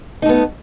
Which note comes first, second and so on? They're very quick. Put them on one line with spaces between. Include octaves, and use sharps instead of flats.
D#4 A3 B3